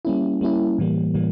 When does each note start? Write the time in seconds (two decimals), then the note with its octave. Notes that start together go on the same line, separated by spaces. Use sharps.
0.05 G3 A#3 C#4 E4
0.41 G3 A#3 C#4 E4
0.78 A2 E3 G3 A#3
1.14 A2 E3 G3 A#3